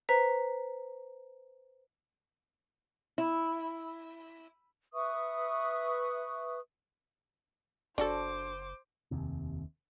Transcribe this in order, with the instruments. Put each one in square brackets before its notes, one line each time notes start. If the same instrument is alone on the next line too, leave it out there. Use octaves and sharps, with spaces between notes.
[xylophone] B4 C5 A#5 B6
[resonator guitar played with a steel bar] E4
[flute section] B4 E5 C#6 D#6
[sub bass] F#1 [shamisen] D4 F#4 A4 [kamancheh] C5 D6
[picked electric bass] F1 D#2 C3